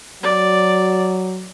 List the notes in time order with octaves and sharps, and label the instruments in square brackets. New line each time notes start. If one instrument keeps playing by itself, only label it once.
[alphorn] F#3 [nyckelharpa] D5